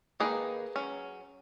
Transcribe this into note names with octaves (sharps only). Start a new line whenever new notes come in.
D#3 A#3 D#4 G#4 B4
F#3 C#4